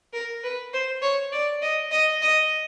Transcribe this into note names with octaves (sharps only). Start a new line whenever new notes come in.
A#4
B4
C5
C#5
D5
D#5
D#5
D#5